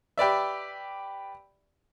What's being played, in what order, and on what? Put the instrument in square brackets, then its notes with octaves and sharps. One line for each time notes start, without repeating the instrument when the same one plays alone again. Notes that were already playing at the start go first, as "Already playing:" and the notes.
[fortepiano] G4 B4 D5 E5